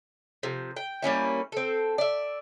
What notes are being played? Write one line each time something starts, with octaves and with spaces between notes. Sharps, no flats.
C3 F3
G5
G3 A#3 C#4 E4
C4 A4
D5 E5